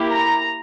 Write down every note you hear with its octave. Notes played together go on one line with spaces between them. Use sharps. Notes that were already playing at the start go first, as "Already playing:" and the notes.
Already playing: A#3 E4 G4
A#5